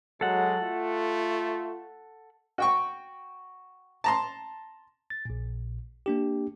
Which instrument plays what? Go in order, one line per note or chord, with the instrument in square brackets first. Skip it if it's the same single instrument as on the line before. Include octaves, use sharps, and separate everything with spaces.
[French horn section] F#3 [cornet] G#3 [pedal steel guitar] A4 F#5
[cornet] A3 [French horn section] F4
[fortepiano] F#4 G5 C#6
A5 A#5 C6
[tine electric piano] A6
A#1 A#2
A#3 D4 G4